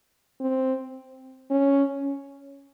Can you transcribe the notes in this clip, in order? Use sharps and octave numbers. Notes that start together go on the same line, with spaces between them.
C4
C#4